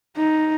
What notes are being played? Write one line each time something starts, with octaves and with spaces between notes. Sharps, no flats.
D#4